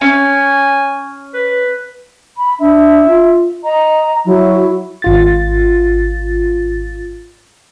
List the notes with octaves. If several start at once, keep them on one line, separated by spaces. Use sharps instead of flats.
C#4 G#5
B4
B5
D4 E5
F4
D#5 A#5
F#3 E4
G#1 F4 A6